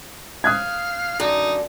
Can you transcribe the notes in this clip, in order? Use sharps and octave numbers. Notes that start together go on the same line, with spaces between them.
F5 D#6 F#6 G#6
F#2 D3 D#4